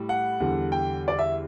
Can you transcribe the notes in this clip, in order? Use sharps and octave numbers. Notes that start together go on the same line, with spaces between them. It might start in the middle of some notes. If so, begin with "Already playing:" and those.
Already playing: A2 G3
F#5
E2 D3 G3
G5
D5
E5